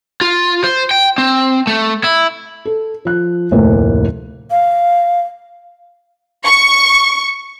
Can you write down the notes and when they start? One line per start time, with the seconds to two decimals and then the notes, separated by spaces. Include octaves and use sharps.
0.21 F4
0.64 C5
0.91 G5
1.18 C4
1.67 A3
2.04 E4
2.65 A4
3.05 F3 F#6
3.51 F1 D2 A2 A#3
4.51 F5
6.46 C#6